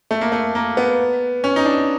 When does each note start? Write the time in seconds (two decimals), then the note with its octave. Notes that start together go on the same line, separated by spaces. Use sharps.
0.11 A3
0.21 A#3
0.32 A3
0.55 A#3
0.77 B3
1.44 C#4
1.56 D#4
1.66 D4